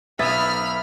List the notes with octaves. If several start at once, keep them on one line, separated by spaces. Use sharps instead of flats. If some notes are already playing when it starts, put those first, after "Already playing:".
B1 B4 E5 B5 D#6 F6 G#6 A6